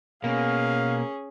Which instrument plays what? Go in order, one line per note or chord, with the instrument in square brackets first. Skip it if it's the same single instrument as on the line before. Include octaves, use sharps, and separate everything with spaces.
[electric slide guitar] B2 [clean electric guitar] A#3 [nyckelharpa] C#4 G#4 [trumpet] F5